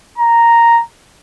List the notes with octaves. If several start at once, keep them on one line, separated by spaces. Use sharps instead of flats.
A#5